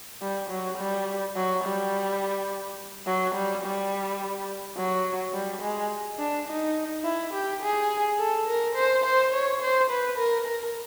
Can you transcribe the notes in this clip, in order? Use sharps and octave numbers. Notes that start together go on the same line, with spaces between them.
G3
F#3
G3
F#3
G3
F#3
G3
G3
F#3
G3
G#3
D4
D#4
E4
G4
G#4
A4
A#4
C5
C5
C#5
C5
B4
A#4
A#4